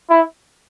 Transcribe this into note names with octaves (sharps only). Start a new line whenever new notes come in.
E4